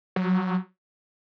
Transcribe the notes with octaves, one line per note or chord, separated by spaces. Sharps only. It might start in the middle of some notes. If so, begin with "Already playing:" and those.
F#3